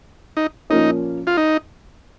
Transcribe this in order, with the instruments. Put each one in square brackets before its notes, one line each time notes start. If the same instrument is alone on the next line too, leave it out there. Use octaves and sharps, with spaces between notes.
[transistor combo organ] D#4
[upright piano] A#2 F3 A#3 C#4 [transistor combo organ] D#4
[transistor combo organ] F4
D#4